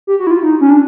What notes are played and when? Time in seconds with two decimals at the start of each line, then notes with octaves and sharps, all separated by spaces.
0.07 G4
0.20 F#4
0.27 E4
0.31 F4
0.43 D#4
0.61 C#4
0.70 D4